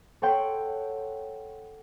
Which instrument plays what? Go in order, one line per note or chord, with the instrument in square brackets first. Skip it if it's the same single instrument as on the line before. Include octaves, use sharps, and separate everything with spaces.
[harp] A4 C#5 F#5 G5 C6